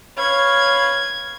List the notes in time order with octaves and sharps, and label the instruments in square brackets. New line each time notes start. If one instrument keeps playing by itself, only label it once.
[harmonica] B4 F5 [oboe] C#5 [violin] G#6